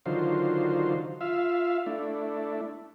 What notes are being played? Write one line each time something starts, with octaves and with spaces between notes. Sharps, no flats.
D3 D#3 F#3 F4 C5
F4 E5 F5
A3 D4 E4